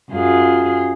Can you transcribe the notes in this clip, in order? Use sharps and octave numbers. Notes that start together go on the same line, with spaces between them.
F#2 F4 G#4